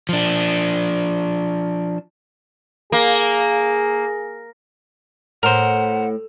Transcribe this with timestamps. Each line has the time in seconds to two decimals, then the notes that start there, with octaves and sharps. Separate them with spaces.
0.09 F3 D4
2.92 A#3 G#4
5.43 A2 A#4 C5 F#5